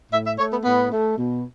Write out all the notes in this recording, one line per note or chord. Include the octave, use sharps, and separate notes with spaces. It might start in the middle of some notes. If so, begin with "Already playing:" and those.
A2 E5
E5
A3 C#5
B3
A2 B3
A3
B2